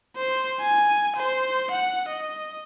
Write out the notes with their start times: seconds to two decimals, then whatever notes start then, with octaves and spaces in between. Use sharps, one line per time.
0.16 C5
0.61 G#5
1.16 C5
1.72 F#5
2.09 D#5